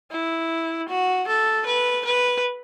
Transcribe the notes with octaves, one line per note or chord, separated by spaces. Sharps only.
E4
F#4
A4
B4
B4